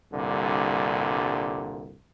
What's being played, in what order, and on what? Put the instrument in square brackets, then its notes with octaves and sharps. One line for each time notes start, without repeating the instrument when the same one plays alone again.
[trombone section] C2 G2 A#2 D3